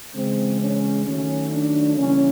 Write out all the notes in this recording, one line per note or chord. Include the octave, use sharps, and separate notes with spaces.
C#3 E3 G#3 C4
C#4
D#3 F#3 A3 C#4
D4
C#3 E3 G3 A#3 C#4